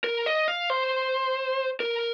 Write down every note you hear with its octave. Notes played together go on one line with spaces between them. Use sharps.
A#4
D#5
F5
C5
A#4